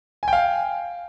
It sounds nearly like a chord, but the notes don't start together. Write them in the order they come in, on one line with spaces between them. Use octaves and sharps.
G#5 G5 F5